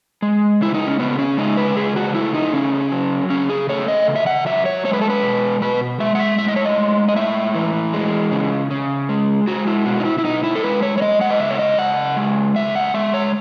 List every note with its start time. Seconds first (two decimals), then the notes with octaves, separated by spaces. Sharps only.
0.22 G#3
0.61 C#3 E4
0.74 D#4
0.87 C#4
0.99 C#3 B3
1.18 C#4
1.37 G#3 D#4
1.57 B4
1.76 C#3 G#4
1.96 F#4
2.15 A3 E4
2.34 D#4
2.53 C#3 C#4
2.92 F#3
3.30 C#3 C#4
3.49 G#4
3.69 A3 C#5
3.88 D#5
4.08 C#3
4.16 E5
4.26 F#5
4.46 F#3 E5
4.66 C#5
4.85 G#3 C#5
4.93 B4
5.01 A4
5.10 B4
5.23 B2
5.62 B2 B4
6.00 G#3 E5
6.15 F#5
6.20 E5
6.39 A2 E5
6.48 D#5
6.56 C#5
6.65 D#5
6.78 G#3
7.08 D#5
7.16 A2 E5
7.55 E3
7.93 G#3
8.32 C#3
8.71 C#3
9.09 G#3
9.47 G#3 F#4
9.67 E4
9.86 B2 F#4
10.00 D#4
10.05 E4
10.18 E4
10.24 B2 D#4
10.43 E4
10.56 A4
10.63 G#3 B4
10.83 C#5
10.98 C#5
11.01 G#3 D#5
11.21 F#5
11.30 D#5
11.40 C#3 E5
11.50 C#5
11.59 D#5
11.78 C#3 F#5
12.17 G#3
12.56 C#3 E5
12.75 F#5
12.94 G#3 E5
13.14 C#5